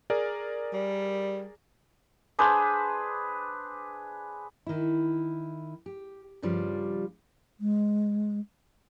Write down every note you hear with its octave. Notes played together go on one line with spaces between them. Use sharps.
G#4 A#4 D5
G3
D4 G#4 B4 C5
D#3 E4
G4
G2 C#3 F3 G3 F4 D5
G#3